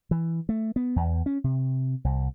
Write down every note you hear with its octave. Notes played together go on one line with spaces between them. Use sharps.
E3
A3
B3
E2
C#4
C3
C2